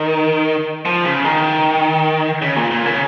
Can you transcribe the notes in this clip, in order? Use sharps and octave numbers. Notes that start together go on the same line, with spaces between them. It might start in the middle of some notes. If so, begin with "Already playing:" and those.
Already playing: D#3
F3
C#3
D#3
C#3
A#2
A#2
C#3